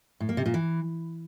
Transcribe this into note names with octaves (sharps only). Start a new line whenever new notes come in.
A2
A#3
C3
A#2
E3